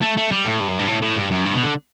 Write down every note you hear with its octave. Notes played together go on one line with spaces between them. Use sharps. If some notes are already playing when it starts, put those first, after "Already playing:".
A3
A3
G3
A2
G2
F#2
G2
A2
A2
G2
F#2
G2
B2
D3